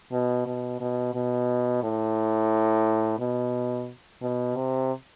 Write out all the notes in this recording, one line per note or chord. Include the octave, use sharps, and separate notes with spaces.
B2
B2
B2
B2
A2
B2
B2
C3